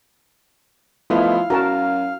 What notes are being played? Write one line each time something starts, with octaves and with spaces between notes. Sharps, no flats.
F3 A3 B3 D#4 E4 F5
F#2 F#4 A#4 A5 A#5